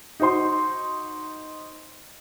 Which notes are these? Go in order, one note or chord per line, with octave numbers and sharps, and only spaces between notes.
D#4 F#4 C5 C6